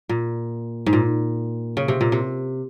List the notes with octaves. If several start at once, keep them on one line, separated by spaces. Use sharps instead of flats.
A#2
G#2
A#2
C#3
C3
A#2
C3